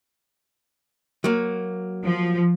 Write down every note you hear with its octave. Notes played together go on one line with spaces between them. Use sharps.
F#3 A#3
F3